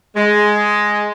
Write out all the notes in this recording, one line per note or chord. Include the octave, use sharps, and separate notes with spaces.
G#3